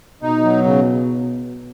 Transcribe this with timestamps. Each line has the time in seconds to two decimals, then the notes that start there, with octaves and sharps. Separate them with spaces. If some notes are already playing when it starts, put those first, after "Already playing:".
0.22 B2 D#4
0.43 F#3
0.64 C#3